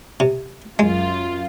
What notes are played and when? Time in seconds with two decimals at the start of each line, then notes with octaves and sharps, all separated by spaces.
0.20 C3
0.79 F#2 G#3 F4